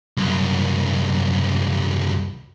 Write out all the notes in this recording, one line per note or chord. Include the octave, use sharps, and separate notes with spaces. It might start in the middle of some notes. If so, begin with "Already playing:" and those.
C2 F#2